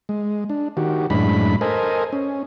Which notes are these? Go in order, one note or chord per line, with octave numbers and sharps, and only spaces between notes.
G#3
D4
D#3 F#4 G4
F#2 A2 G#3 D4 B5
A4 A#4 C5 D#5 G#5
C#4